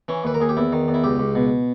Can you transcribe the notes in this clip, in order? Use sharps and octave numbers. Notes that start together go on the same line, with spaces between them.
E3 C#4
D#2 B4
A#4
D#2 G#4
G4
E2 E4
D#3
E2
E4
C#2 G4
C#2
B2